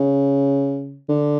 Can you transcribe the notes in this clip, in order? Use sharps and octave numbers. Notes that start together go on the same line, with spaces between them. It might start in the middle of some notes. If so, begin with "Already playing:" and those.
Already playing: C#3
D3